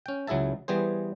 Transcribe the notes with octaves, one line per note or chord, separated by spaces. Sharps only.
C#4 G5
C#2 F#3 E4 G#4 E5 A5
E3 G3 B3 G#4 C5